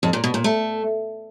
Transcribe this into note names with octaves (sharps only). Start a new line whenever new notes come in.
F2
A#2
B2
A#2
A3